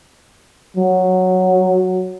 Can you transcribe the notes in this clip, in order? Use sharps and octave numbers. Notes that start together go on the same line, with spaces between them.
F#3